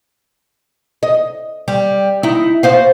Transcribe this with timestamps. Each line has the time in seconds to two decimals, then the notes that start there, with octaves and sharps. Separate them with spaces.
1.03 D#5
1.68 G3
2.23 D#4 E4
2.63 F#4 C5 F5